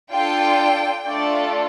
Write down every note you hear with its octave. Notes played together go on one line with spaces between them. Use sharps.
D4 F4 A4 G5
A3 D4 F4 A4 D5